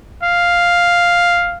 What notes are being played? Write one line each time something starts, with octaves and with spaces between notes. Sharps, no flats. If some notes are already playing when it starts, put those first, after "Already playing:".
F5